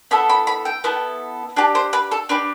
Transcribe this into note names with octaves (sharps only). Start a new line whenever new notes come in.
B3 E4 A4 B5
B5
B5
G5
B3 E4 A4
D4 G4 A5
C5
B4
A4
D4 G4 B4